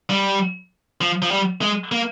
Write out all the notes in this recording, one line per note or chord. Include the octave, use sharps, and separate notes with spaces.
G3
F3
F3
G3
G#3
A#3